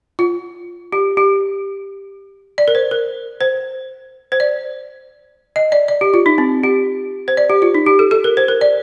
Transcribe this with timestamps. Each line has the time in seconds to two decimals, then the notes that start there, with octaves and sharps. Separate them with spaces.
0.19 F4
0.93 G4
1.17 G4
2.58 D5
2.68 A#4
2.75 C5
2.91 A#4
3.41 C5
4.32 C5
4.40 D5
5.56 D#5
5.72 D5
5.88 D5
6.01 G4
6.14 F4
6.26 D#4
6.38 C4
6.63 G4
7.28 C5
7.37 D5
7.50 G4
7.62 F4
7.74 D#4
7.86 G4
7.99 A4
8.11 A4
8.24 A#4
8.37 C5
8.48 A#4
8.61 D5